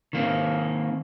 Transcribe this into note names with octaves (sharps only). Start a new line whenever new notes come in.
D#3 A#3 C4